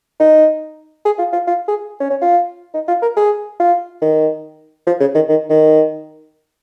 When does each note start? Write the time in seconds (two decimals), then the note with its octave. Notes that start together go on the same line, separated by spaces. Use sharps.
0.20 D#4
1.05 G#4
1.19 F4
1.33 F4
1.47 F4
1.68 G#4
2.00 C#4
2.10 C#4
2.22 F4
2.74 D#4
2.88 F4
3.02 A#4
3.17 G#4
3.60 F4
4.02 D#3
4.87 F3
5.01 C#3
5.15 D#3
5.29 D#3
5.50 D#3